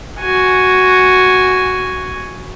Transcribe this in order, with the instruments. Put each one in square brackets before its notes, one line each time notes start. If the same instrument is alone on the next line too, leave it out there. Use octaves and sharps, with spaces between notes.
[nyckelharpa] F#4 G#5